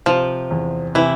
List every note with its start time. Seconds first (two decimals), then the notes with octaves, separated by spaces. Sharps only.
0.06 C3 F3 F4
0.51 E2
0.95 C3 E3 E4